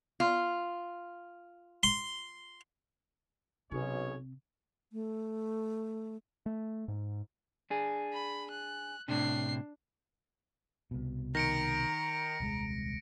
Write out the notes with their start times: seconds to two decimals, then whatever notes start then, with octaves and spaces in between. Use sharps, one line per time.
0.20 F4
1.83 C6
3.71 B1 C3 C#4 G#4 C#5
4.93 A3
6.46 A3
6.88 G#2
7.70 D4 G#4
8.13 B5
8.51 F#6
9.08 A2 C3 D4 C7
10.91 C2 B2
11.35 D#3 A#5 A#6 C#7 D7
12.40 D#1 C2 G#3